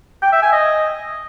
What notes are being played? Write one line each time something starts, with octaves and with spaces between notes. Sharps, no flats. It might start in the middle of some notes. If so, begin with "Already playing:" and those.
G5
E5
G#5
D#5